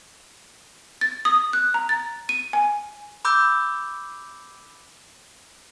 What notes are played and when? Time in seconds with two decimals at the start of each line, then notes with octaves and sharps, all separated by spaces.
1.01 A6
1.25 D#6
1.53 F#6
1.74 A#5
1.89 A6
2.29 D#7
2.53 G#5
3.25 B5 D6 E6 G6